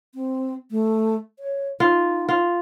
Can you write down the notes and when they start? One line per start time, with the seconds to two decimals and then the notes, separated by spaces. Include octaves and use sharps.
0.15 C4
0.71 A3
1.39 C#5
1.80 D#4 F4
2.29 F4